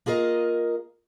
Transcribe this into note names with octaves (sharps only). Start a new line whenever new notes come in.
A#3 F4 G#4 A#4 D#5